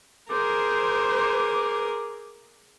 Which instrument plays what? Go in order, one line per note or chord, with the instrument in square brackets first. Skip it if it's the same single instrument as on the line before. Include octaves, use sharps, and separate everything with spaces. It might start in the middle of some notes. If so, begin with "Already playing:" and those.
[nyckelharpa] G#4 A#4 [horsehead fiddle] C5 [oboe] D6